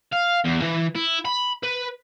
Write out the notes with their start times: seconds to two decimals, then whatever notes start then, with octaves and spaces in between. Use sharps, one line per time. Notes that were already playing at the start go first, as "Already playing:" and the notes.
0.12 F5
0.44 E2
0.62 E3
0.96 E4
1.25 B5
1.63 B4